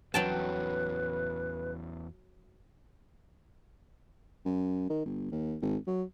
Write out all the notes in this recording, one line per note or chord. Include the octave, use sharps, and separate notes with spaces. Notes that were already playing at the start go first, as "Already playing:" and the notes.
E2 F#3 C#4 B4 G5 A5
F#2
D#3
G1
D#2
G#1
F#3